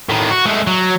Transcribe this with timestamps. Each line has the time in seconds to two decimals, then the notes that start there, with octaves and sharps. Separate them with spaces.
0.09 A2 D#3
0.31 F#4
0.45 G#3 A3
0.67 F#3